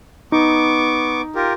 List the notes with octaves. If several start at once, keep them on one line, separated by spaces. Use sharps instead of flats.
B3 D#4 C#6 D6
F4 G4 A#4